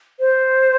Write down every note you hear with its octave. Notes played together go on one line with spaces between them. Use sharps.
C5